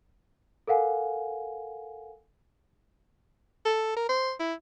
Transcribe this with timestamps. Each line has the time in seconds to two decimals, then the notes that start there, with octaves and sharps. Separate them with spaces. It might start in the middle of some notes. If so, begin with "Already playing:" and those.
0.67 A4 A#4 F5 F#5 G#5
3.65 A4
3.97 A#4
4.09 C5
4.40 E4